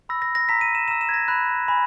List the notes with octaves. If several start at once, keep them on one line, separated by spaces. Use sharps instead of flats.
B5 E6 A#6
A#6
A#6
A#5 E6 B6
D#7
E7
A#5 E6 E7
E7
G#6
A#6
B5 F#6
G#5 B5 E6